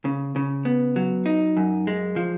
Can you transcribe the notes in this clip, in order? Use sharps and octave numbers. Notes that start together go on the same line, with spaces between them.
C#3
C#3
B3
F#3
D#4
F#2
G#3
F3